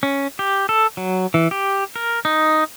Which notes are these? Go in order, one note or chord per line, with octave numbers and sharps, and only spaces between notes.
C#4
G4
A4
F#3
E3
G4
A#4
D#4